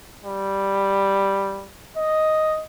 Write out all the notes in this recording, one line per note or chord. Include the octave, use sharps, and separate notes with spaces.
G3
D#5